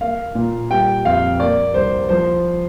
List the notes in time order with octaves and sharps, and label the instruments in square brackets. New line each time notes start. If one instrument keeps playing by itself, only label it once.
[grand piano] A#3 F5
A#2
G3 G5
F2 F5
A#3 D5
C2 C5
F3 C5